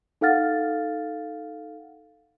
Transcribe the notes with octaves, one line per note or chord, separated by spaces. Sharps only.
D#4 A4 F5 F#5 F6 A6